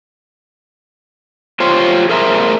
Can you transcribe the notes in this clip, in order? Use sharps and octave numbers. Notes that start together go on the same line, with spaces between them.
F4 G4 C5 C#5
G#4 A#4 C5 E5 A5 A#5